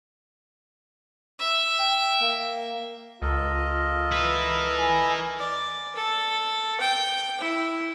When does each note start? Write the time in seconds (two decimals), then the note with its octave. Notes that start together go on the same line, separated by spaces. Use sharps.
1.40 E5
1.79 G5
2.22 A#3
3.22 C#2 F4 A4 A#4 D#5
4.12 E4 B4
4.78 G#5
5.38 D5
5.96 A4
6.80 G5
7.40 E4